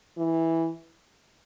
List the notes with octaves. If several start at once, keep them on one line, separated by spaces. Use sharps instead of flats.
E3